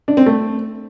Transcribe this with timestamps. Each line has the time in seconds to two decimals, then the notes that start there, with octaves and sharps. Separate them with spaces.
0.08 D4
0.17 C4
0.26 A3